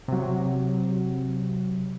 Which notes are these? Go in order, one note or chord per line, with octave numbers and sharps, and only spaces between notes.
C3 F#3